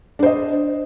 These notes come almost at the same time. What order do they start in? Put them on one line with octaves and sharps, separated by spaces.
D4 C5 D#5